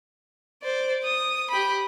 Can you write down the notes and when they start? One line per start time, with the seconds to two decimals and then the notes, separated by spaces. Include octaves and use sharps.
0.63 C5 D5
1.04 D#6
1.50 G4 B5